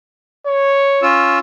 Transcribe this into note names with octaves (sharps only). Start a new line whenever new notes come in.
C#5
C#4 F4 E6